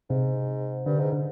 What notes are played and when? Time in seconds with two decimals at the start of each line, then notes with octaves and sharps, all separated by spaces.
0.10 G#2 C3
0.85 G2 D3
0.99 G#2
1.13 D3